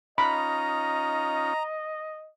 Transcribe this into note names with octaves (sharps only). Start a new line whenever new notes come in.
C#4 D#4 F4 D#5 A#5 B5